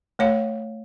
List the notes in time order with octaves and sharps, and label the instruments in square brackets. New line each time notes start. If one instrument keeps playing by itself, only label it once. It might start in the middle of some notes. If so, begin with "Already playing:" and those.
[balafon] A3 C#5 F5